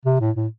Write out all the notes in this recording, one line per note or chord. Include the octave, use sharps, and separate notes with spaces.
C3
A2
A2